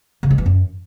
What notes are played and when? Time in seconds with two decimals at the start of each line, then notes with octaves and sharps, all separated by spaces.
0.23 C#3
0.31 G#3
0.38 E3
0.46 F#2